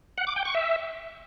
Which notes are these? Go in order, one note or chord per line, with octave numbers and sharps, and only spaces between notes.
F#5
D6
G5
C#6
E5